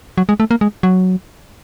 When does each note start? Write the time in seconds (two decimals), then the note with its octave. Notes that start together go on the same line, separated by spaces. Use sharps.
0.18 F#3
0.29 G#3
0.40 A3
0.51 A#3
0.61 G#3
0.83 F#3